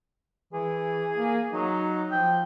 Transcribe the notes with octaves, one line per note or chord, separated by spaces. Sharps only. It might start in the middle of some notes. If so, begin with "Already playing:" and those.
E3 G#4
A#3
F#3 D#4
F3 G5